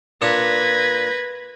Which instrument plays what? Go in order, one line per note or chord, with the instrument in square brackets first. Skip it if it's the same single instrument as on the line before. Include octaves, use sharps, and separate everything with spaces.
[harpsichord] A#2 D4 [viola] B4 [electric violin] G#6 A#6